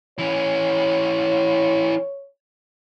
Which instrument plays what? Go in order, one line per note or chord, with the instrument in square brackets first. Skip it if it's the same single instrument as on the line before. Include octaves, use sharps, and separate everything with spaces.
[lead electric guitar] E3 C#4 [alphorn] C#5